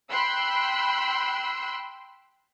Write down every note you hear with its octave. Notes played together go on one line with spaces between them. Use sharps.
G5 B5 C6 E6 F#6